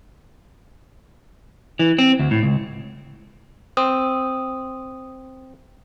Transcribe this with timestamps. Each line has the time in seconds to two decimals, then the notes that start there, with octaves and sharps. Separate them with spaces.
1.79 E3
1.98 C4
2.19 D2
2.31 A2
2.43 C#2
3.77 C4 D#6